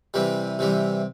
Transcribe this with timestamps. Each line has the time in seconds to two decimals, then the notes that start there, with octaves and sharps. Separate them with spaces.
0.14 C3 E3 G3
0.59 C3 E3 G3